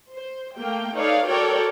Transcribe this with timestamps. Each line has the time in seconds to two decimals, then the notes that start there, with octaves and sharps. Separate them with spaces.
0.14 C5
0.56 A3 A#3 G5
0.96 D#4 A4 B4 C#5 D5 F5
1.26 F#4 A4 A#4 C#5 D5 G5